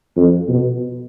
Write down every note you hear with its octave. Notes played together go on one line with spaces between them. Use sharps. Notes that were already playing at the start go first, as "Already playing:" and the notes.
F2
B2